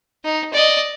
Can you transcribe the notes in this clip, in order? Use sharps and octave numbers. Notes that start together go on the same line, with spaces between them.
D#4
D5 D#5